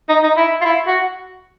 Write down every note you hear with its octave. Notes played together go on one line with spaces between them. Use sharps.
D#4
D#4
E4
F4
E4
F#4